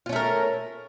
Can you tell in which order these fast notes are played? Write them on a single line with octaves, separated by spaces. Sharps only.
F4 C#4 A3 A#4